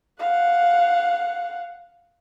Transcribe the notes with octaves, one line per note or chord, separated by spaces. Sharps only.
F5 F#5